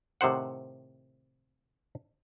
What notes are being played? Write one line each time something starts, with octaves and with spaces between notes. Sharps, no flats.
A2 C3 D#3 C5 F#5